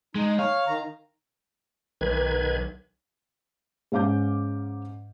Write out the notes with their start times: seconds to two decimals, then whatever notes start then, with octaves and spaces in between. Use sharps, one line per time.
0.15 G#3 D#4
0.39 C#5 F5
0.67 D#3 A#5
2.01 B1 D#3 B4 G#6
3.92 G#2 C#4 F5 D6 G6